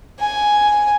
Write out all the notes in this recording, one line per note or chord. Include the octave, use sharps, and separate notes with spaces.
G#5